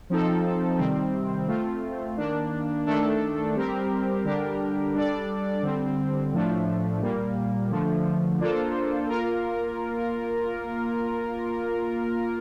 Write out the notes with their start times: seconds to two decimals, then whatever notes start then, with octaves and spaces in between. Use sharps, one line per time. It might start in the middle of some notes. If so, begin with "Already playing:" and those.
0.10 F3 C4 D#4 A4
0.79 C3 D#3 G3 C4
1.48 A3 C4 F4
2.17 D#3 A#3 D4
2.86 D#3 A3 D4 A4
3.55 G3 C4 G4 A#4
4.24 D3 G3 D4 G4 A#4
4.94 G3 D4 A4 D5
5.62 D3 G3 C4
6.32 A2 F3 A3 D4
7.01 A#2 G3 A#3
7.71 D3 F3 A3
8.39 A#3 D4 F4 A4 C5
9.09 A#3 F4 A#4